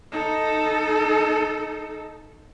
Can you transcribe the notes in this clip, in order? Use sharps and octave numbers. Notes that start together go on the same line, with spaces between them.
D#4 A4